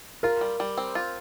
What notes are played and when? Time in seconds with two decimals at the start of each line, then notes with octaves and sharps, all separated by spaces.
0.23 F4 A#4
0.41 G3
0.60 G3
0.78 C4
0.95 F4